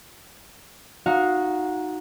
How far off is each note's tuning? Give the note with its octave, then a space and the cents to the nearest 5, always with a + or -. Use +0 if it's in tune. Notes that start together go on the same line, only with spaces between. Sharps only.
D#4 +0 F#4 -15 F5 +5